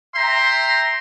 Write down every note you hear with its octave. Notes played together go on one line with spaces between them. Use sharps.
E5 G5 A#5 C6